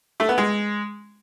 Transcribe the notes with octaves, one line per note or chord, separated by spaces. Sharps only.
A3
B3
G#3